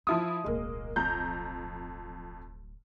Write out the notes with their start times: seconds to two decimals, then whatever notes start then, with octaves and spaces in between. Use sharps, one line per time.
0.07 F3 D#4 E4 D#6
0.44 D1 B1 G#3 A#3
0.96 F2 A#5 G6